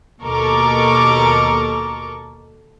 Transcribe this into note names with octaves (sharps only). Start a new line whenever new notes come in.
D#2 B2 A4 A#4 C#6 D6